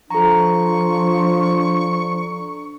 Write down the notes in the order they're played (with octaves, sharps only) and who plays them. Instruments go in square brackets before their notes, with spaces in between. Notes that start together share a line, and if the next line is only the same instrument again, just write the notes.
[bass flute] F3 [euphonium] D4 [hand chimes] A4 A#5 [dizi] C#6